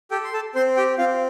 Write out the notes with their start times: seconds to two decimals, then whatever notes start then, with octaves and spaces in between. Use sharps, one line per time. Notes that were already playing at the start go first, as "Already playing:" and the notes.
0.11 G4 A4 G5
0.24 C6
0.33 A4 A5
0.55 C4 C5 C6
0.76 G4 G5
0.98 C4 F4 F5